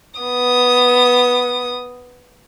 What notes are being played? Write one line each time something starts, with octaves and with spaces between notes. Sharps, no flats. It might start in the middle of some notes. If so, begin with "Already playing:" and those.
B3 D#6